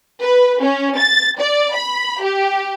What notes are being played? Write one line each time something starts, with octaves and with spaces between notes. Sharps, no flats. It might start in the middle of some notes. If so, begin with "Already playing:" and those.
B4
C#4
A6
D5
B5
G4